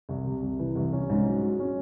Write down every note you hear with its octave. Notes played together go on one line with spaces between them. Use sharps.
C2
C3
C2
E3
C2
C#4
G#2
F#3
F#4
C#4